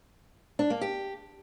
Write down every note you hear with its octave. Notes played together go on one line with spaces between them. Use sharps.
D4
A#3
G4